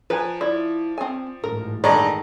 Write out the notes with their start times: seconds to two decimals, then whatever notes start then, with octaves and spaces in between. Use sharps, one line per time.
0.10 F3 B4 G#5 A#5
0.41 E4 D5
0.98 C4 G#5
1.44 A1 G#2 A#4
1.84 G2 D#3 G#4 A4 D5 D#5 A#5